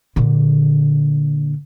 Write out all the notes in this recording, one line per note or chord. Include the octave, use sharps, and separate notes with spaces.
A#2 D3